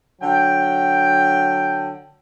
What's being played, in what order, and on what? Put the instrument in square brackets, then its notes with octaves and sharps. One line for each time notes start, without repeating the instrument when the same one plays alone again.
[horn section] D3 F#3 G5